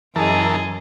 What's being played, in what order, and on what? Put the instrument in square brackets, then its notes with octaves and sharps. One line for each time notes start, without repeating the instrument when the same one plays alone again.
[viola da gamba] F#2 G#4 D#5 [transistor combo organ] E3 A#4 A5